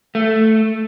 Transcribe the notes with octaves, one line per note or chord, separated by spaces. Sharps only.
A3